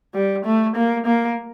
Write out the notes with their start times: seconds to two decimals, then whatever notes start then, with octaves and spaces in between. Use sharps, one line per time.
0.14 G3
0.45 A3
0.76 A#3
1.06 A#3